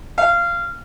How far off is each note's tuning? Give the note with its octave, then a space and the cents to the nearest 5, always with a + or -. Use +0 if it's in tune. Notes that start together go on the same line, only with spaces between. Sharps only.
F5 -20